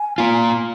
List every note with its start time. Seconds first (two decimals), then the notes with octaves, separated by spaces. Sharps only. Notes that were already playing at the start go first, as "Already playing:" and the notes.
Already playing: G#5
0.18 A#3 F4